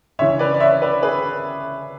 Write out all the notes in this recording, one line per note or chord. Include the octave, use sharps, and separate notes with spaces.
C#2 C#3 E3 C#5 E5
B4 D5
D5
C#5 E5
B4 D5
G#4 B4